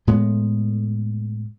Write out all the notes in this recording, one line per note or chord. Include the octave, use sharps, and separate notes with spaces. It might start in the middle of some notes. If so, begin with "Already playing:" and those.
A2 G#3 B3